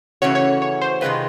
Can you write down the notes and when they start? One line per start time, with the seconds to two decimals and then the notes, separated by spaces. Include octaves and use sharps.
0.22 C#3 E3 A3 C#4 F#4 C#5
0.35 C#5
0.62 C#5
0.82 C5
1.01 C3 D#3 G#3 C4 F4 B4